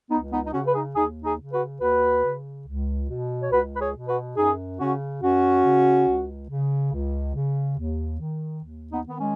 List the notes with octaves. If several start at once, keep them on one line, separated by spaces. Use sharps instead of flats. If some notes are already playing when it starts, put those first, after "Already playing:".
C#2 B3 D#4
B3 D#4
D#4
C#3 C#4 F#4
B4
D#4 G#4
D#2 D#4 G#4
D#4 G#4
C#3
F#4 B4
D#2 F#4 B4
C#3
C#2
B2
C#5
C#2 F#4 B4
B4
G#4 C#5
B2
F#4 B4
F#2 D#4 G#4
C#3 C#4 F#4
F#2 C#4 F#4
C#3
C#2
C#3
C#2
C#3
D#2
D#3
D#2
B3 D#4
D#3 B3
G#3 C#4